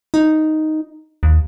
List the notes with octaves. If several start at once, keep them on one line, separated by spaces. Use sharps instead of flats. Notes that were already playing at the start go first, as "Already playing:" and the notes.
D#4
D#2